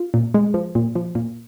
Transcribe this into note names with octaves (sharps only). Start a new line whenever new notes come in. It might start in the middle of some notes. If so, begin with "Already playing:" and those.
Already playing: F4
A#2
G#3
F3
A#2
F3
A#2